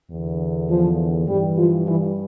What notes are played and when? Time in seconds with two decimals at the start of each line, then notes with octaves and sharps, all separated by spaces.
0.11 E2 D3
0.70 F3
1.28 G2 E3 G3
1.57 F3
1.87 E3